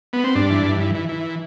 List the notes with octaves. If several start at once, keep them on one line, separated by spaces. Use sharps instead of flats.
B3
C4
G2 D4
E3
G2
E3
E3
E3